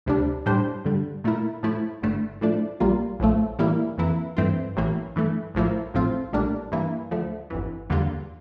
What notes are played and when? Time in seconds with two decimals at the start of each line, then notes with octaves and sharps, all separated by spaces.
0.06 D2 C3 G3 D4
0.46 A2 G3 D4 G4 C5
0.85 G2 D3 G3
1.24 A#2 A3 E4 A#4
1.63 A2 F3 A3 E4
2.02 G1 G2 D3 A3
2.41 A2 F3 A3 D4
2.80 A#1 A#2 G3 A#3 F4
3.20 A#1 A2 F3 A3
3.59 A2 E3 G3 A#3 E4
3.98 F2 E3 A#3 E4
4.37 G2 E3 A3 C4 F4
4.76 A1 A2 E3 A#3
5.16 G2 E3 A3
5.55 A#1 A2 F3 A#3 E4
5.94 A1 A2 F3 C4 F4
6.33 A#1 A2 G3 A#3 D4
6.72 G2 E3 A#3 E4
7.11 D2 D3 F3 A3
7.50 G1 F2 E3
7.90 E2 D3 G3 A#3 F4